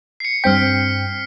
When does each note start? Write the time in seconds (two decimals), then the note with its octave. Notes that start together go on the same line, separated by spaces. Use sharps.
0.20 C7 C#7
0.44 G2 C4 G5 F6 B6